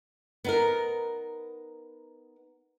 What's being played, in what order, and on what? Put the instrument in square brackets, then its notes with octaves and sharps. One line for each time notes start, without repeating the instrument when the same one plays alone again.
[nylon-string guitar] B3 D#4 A#4